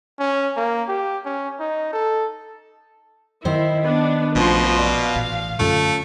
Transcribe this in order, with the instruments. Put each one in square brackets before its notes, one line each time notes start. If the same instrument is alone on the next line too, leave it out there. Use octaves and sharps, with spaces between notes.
[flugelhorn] C#4
A#3
G4
C#4
D#4
A4
[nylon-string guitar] D#3 D#4 C5 [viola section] E4
[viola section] B3 D4
[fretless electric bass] A#1 A3 C#4 [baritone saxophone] B2 [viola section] F3 C6
[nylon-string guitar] D5 [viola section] F5
[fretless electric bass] A1 A#2
[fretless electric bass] F#2 D3 [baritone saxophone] A3 [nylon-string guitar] C#4 F4 A4